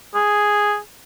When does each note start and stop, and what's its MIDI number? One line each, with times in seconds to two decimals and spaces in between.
0.14 0.78 68